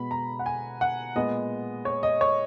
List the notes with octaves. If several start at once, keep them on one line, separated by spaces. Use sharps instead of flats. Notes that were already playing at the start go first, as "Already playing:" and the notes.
Already playing: B2 G#3 B3 B5
A#5
F#5
G#5
F#5
A#2 G#3 B3 D#5
C#5
D#5
C#5